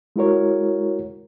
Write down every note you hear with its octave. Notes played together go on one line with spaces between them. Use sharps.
G#3 E4 F#4 A#4 C#5